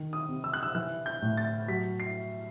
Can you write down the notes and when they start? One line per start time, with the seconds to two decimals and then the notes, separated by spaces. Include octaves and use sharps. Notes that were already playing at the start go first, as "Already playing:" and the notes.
Already playing: D#3
0.13 D#6
0.29 C3
0.44 E6
0.53 F#6
0.63 E6
0.75 E3 F#6
1.06 G6
1.22 A2
1.37 A6
1.68 F#3 B6
2.00 C7